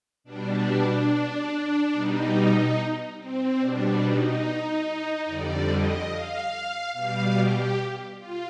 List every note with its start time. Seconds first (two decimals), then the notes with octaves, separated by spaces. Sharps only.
0.24 B2 G3 D4
1.92 B2 G3 D#4
3.17 C4
3.59 B2 G3 D4
4.00 D#4
5.25 F2 D3 G3 D5
5.67 D#5
6.09 F5
6.92 B2 G3 F5
7.34 G4
8.18 F4